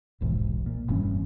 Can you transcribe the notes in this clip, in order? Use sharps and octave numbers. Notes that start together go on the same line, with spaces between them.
D#1 B1 G#2 E3
A#2
F1 G2 E3 C#4